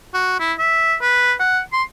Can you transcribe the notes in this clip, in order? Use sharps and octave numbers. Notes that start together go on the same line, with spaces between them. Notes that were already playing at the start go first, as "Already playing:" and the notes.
F#4
E4
E5
B4
F#5
C6